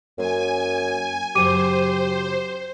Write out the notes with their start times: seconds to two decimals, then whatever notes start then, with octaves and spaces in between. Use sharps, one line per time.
0.18 F#2 A#3 C5 G#5
1.35 F#2 C#3 F#3 G4 C5 D6 D#7